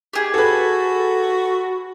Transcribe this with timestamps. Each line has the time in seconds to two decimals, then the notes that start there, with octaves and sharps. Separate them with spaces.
0.13 G4 G#4
0.34 F#4 A4 B4